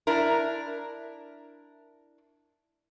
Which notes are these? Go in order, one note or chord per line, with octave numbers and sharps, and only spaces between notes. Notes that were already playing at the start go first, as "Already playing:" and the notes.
D4 E4 A#4